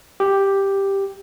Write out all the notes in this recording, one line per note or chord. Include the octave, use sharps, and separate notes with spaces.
G4